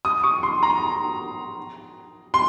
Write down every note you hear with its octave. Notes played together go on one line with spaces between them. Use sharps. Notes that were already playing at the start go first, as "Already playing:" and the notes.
D#6
C#6
C6
A#5
C6